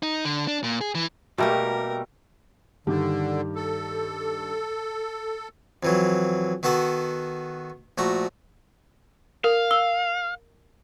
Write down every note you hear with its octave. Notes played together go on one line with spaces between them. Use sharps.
D#4
D3
D4
A#2
G#4
E3
B2 G3 A3 A#3 G4 A#4
G2 D3 D#3 G4
A4
F2 E3 F#3
D#3 B3 F#4 A4 F#5
A#1 A3 F#4 A#5
A#4 F5
E6 G7